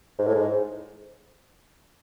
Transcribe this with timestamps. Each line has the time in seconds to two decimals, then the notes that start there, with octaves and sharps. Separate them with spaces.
0.19 G#2
0.27 A2
0.35 G#2